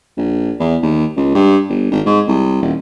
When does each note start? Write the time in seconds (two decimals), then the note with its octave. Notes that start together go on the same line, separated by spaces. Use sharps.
0.17 A#1
0.60 E2
0.82 D#2
1.17 C#2
1.35 G2
1.70 G1
1.91 G#1
2.06 G#2
2.28 C2
2.62 D#1